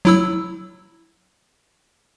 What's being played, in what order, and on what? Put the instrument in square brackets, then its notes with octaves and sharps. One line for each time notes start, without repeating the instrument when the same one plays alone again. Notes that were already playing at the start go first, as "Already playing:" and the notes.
[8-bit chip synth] F#3 E4 E6